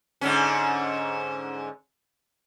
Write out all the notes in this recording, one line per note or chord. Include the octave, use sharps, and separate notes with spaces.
G#2 D3 C#4